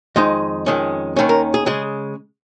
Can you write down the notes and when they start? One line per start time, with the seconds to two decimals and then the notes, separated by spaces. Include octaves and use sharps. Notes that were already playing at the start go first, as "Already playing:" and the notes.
0.16 F2 D#3 G#3 D#4 D#5
0.66 F2 D#3 G#3 C#4
1.16 D#2 D#3 C#4
1.29 A#4
1.54 G#4
1.66 C#3 G#3 G#4